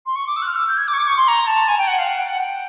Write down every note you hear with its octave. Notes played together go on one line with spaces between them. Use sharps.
C6
C#6
D6
E6
F#6
F6
E6
G6
G#6
D6
C#6
D6
C#6
C6
A#5
A5
G#5
G5
F#5
F5
F#5
G5
F#5
G5